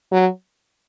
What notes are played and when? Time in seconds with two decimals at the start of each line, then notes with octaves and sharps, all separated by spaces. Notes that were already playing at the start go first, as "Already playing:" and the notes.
0.12 F#3